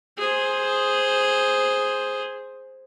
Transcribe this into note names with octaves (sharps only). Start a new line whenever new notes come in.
G#4 C5